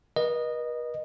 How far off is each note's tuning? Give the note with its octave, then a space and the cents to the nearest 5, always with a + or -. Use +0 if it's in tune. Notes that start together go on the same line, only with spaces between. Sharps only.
B4 -45 D#5 -15